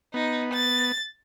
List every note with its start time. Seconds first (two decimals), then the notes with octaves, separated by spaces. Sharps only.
0.14 B3 D#4
0.53 A6